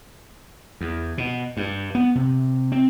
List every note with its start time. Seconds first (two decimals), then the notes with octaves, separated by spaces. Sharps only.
0.81 E2
1.18 B2
1.57 G2
1.95 B3
2.15 C3
2.72 C4